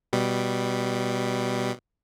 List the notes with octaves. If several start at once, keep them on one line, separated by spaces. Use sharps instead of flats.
B2 G3